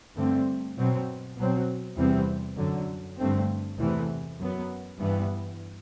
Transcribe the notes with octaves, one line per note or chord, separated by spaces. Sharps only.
G2 D3 A3 C4
B2 F#3 C4
B2 F#3 C4
E2 C3 E3 G3 C4
F#2 D3 F#3
G2 D3 A3 C4
E2 C3 E3 A3
F#2 F#3 B3
G2 E3 B3